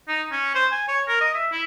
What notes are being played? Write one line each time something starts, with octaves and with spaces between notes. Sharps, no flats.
D#4
C#4
C5
G#5
C#5
A#4
D#5
E5
E4